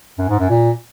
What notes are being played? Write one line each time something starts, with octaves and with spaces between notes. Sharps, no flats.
F#2
G#2
F#2
A#2